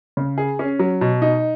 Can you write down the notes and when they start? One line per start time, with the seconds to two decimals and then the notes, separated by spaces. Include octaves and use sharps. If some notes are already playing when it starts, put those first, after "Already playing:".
0.17 C#3
0.38 G#4
0.59 C#4
0.79 F#3
1.01 B2
1.22 D#4